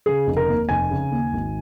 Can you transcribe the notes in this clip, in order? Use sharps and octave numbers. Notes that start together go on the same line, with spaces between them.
C#3 G#4
F1
A#4
D#2
F1 G#5
C#3
D#2
G#1